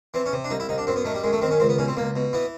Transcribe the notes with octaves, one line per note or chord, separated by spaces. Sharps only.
E3 C4
C#4
C3
D4
C2 D#4
E4
C2 D#4
D4
F#2 C4
B3
D#3 A3
G3
F#2 G#3
A3
D#3 C4
C#4
C#2 C4
B3
B2 C#4
C4
C#2 A#3
B2
E3 B3